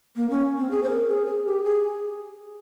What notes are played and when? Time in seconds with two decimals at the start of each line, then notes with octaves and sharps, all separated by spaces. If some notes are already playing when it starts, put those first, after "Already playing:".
0.16 A#3
0.30 C#4
0.58 C4
0.71 G#4
0.83 C5
0.90 A#4
1.09 G#4
1.27 G#4
1.45 G4
1.64 G#4